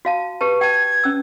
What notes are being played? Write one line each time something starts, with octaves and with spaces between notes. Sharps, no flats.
F#4 F5 A5
G4 B4 A5
G5 A5 G#6
C#4 E6